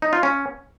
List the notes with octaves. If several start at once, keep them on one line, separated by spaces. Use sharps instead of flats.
D#4
F4
C#4